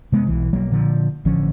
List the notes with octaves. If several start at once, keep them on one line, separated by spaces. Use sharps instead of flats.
C3 G#3 B3
B1 E3
B1 F#3 G3 A#3
A#2 D3 F3
A1 D3 F3 C#4